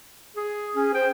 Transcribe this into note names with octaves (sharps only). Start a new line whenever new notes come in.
G#4
C#4 G#4
C5 G5